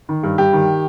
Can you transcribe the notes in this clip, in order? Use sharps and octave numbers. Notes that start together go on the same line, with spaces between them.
D#3
G2
G2 G4
D#3